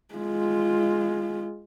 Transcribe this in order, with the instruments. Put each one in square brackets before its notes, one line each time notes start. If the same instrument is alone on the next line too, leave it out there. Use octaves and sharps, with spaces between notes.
[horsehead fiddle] G#3 F4